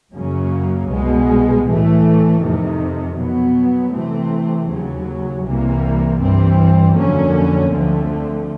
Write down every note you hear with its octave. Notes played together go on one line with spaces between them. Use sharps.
F#2 C#3 F#3 A#3 C#4
C2 B2 G#3 B3
A2 E3 A3
F2 C3 D#3
B2 F#3 B3
C3 E3 A3 C4
D#2 C#3 F#3
C2 C3 E3 G3 A#3
G2 E3 G3 C4
F2 D3 F#3 A#3 C#4
D2 D3 F3 A3 C4